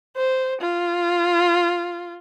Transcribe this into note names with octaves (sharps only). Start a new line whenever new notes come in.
C5
F4